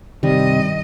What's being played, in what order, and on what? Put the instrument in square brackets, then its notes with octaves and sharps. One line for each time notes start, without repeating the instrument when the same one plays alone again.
[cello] G2 D#5 [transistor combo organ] C3 [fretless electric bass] D#3 [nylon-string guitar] G3